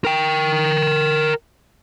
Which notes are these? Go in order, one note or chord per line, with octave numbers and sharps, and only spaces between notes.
A#4 G5